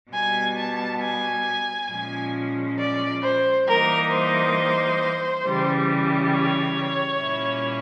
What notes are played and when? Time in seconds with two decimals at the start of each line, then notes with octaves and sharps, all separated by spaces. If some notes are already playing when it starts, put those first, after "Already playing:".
0.12 B2 G3 B3 G#5
0.57 A5
1.01 G#5
1.89 A#2 F3 G#3 C#4
2.78 D5
3.22 C5
3.67 E3 G3 A#3 D#4 A#4
4.11 C5
5.44 C#3 E3 G3
6.33 C#5
7.21 A#2 G3 A#3 C#4 E4